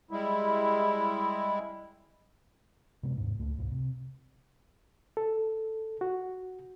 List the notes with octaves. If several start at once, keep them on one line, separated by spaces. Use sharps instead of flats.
G3 G#3 E4
C3 G#3 B3
D#2 G#2
C#2 A3
C2 F2 G#2
C3
A4
F#4